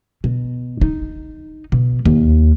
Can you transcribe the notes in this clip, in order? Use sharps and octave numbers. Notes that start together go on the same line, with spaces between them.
B2
D#4
B2
D#2